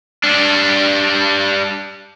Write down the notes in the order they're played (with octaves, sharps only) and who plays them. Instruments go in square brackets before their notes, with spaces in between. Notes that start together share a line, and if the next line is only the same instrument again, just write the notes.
[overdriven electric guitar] G3 D4